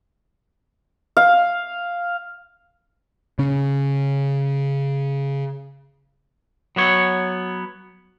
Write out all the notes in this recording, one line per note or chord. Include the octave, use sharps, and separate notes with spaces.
F5
C#3 C#4
F#3 B3 C#5